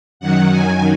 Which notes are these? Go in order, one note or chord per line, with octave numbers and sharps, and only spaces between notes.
F#2 D#3 F#3 F#5
G#5